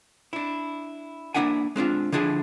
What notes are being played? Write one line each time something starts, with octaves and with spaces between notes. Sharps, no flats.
D4 E4
A#3 C#4 D4 E4 F#5 G#5
G#3 C4 D4 F4
D3 F3 D4 E4 G#4